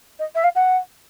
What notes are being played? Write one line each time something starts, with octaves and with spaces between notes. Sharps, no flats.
D#5
E5
F5
F#5